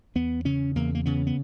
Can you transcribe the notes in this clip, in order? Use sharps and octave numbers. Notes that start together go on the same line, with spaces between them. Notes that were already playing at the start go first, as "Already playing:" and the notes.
E2 B3
C#3 C#4
E2 A#3
A#3
C#3 B3
B3